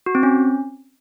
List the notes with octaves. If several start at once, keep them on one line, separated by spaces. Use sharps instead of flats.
F#4
C4
C#4